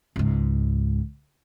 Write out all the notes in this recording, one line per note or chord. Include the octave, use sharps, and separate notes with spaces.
C#2 G#2